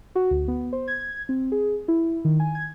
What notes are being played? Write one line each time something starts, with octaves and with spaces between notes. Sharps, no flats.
F#4
D2
B3
C5
G#6
C4
G#4
E4
D#3
G#5
G#6